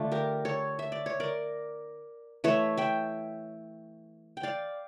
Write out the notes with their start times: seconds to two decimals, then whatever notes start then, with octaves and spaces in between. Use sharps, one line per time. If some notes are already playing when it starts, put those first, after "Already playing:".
Already playing: D3 A3 D4 F4
0.12 G4 A#4
0.45 A4 C#5
0.79 E5
0.92 D5
1.06 C#5
1.20 A#4 D5
2.44 E3 A3 C#5 E5
2.77 E5 G5
4.37 G5
4.43 D5 F5